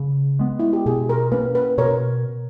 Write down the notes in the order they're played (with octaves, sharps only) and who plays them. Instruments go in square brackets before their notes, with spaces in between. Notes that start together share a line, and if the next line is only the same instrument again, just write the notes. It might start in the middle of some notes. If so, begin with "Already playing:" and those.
Already playing: [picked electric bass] C#3
G#3 B3
[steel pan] E4
G4
[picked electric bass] B2 [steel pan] G#4
[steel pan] A#4
[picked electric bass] A#3 C#4 [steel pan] B4
[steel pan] B4
[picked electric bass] B2 [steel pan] A#4 C#5